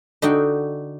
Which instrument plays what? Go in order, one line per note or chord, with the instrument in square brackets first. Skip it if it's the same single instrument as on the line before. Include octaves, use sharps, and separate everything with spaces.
[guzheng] D3 D#4 F#4 G5